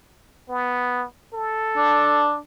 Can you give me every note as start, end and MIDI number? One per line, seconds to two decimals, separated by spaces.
0.49 1.06 59
1.34 2.28 69
1.77 2.38 62